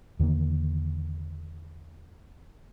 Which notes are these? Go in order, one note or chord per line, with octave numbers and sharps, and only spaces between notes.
E2 D3 D#3 A#3